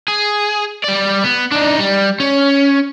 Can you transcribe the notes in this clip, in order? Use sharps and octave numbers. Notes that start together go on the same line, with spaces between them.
G#4
G3 D5
B3
D4 D#4
G3
C#4